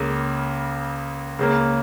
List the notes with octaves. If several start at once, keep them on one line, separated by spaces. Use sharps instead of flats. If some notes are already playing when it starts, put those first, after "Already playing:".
Already playing: C#2 C#3 A#3
C#2 C#3 A#3